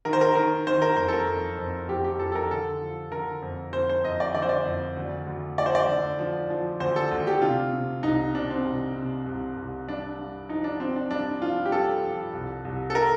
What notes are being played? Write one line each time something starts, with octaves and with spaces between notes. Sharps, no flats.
D#3 A#4
C5
A#4
D#3 A#4
D#3 C5
A#4
F2 C5
A4
A#4
F2
F2
F2 G4
G4
F2 A4
A4
A#4
D3 A4
F3
D3 A#4
F2
F2 C5
C5
F2 D#5
D5
D3 D5
C5
D5
F2
D2
D2
F3 D5
C5
D5
D3
F3
F3
D2 C5
A4
D2
G4
C3 F4
C3
C2 D#4
C3 D4
C4
C2
C3
C2
C2
G2 D4
G2
F3 D#4
D4
F3 C4
D4
G2 D4
F3 F4
G4
G2 A4
F3
C2
C2
A4
A#4